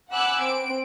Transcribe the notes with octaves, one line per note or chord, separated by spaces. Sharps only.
F#5 G#5 B5 D6 E6 F#6
C4 D7